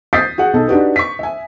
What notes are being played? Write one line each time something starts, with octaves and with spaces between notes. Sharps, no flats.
D#6 G6 A6 B6 C7
F#4 G#4 F#5
B1 A4
D4 D#4 F#4 G4 B4
C#6 B6
E5 G#5